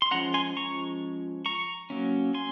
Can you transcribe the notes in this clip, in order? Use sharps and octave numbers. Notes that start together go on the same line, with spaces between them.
C6
F3 G#3 C#4 F#5 A#5
G#5 C6
A#5 C#6
A#5 C#6
F#3 A#3 C#4
G#5 C6